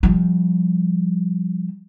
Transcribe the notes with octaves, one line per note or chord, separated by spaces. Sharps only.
F3 G3